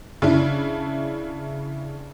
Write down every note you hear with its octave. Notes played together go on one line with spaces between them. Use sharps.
C#3 D4 E4